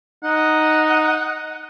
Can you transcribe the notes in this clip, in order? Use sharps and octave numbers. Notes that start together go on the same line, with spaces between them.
D#4 F#5